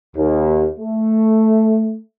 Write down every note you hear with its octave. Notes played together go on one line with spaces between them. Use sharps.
D#2
A3